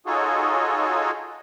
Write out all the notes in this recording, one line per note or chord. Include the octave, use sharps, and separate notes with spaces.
D#4 F4 F#4 G#4 A4 C#5